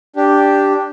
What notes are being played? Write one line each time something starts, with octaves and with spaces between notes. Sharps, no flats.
D4 G4